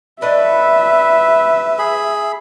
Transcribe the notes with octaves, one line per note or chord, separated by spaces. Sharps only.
A3 D4 B4 D#5 E5
G#4 B5